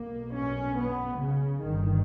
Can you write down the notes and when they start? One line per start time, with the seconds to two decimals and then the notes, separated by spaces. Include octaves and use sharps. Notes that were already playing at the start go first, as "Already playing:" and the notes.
Already playing: B1 B2 A#3
0.34 C#4
0.77 B3
1.19 C#3
1.62 G1 G2 D#3